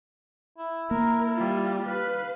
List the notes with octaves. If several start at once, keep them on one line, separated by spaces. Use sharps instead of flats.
E4
A#3 A#4
G3 F4
B4 F5